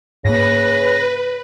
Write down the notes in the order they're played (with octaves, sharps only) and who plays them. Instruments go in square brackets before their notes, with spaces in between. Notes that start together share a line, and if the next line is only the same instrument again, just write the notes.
[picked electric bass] G#2 A#3 [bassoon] C#3 [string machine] B4 [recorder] A#6